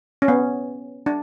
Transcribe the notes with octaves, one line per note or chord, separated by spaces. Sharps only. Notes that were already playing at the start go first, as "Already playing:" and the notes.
C#4
B3
D4